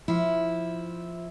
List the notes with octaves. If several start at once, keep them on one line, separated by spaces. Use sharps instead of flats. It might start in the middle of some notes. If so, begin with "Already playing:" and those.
F3 E4